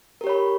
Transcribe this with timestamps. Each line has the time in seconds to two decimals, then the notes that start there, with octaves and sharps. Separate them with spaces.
0.21 A#4
0.24 G4
0.27 C#5
0.29 B5